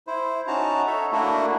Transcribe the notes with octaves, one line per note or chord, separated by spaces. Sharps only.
E4 C5
C#4 D#4 F#4 A5 A#5
A4 C#5 E5
A3 A#3 D4 E4 F#4